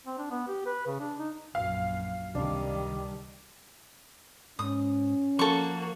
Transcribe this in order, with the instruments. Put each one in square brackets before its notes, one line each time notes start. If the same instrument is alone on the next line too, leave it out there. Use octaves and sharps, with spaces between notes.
[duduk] C4
D4
B3
G4
B4
C#3
D4
D#4
[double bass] A#1 F#2 [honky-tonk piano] F5
[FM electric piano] C#2 C3 [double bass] D#3 G3 [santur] D4
[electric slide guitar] G#2 [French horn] C#4 [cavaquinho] D#6
[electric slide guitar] F3 [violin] A#3 F#4 [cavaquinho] A4 C#6